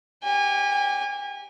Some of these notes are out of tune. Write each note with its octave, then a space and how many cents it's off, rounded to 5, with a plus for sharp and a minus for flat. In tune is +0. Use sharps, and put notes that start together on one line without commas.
G4 -5 G#5 -30